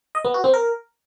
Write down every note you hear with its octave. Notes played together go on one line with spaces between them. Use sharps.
D#5
B3
F#4
C4
A#4